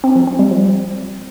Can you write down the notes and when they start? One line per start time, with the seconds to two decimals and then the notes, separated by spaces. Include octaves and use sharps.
0.04 C4
0.16 F3
0.27 C4
0.39 G3
0.51 F3